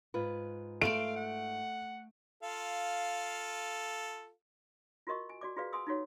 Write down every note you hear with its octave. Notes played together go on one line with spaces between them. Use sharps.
G#2 F4 B4
A3 F5 C6 D7
F#5
F4 A4 F5
F4 F#4 A#4 D#5 C#6
G#5
F#4 D5 D6
F4 F#4 G#4 B4 D5 F5
F#5 G#5 C6 D#6 E6
D#4 F4 F#4 C#5 F#5